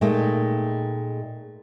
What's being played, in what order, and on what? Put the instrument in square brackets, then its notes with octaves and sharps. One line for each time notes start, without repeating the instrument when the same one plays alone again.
[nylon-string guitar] A#2 G#3 A3 D#4 E5 G5